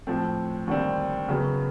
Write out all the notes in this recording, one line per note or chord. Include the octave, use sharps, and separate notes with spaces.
A2 F3 A3 C4
D#2 D3 G3 C4
F#2 C#3 F#3 B3